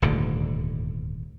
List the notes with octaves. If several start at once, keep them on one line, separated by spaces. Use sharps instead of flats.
D#1 D2 G#2 D3